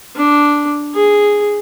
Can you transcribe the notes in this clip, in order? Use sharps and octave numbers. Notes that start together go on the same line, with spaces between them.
D4
G#4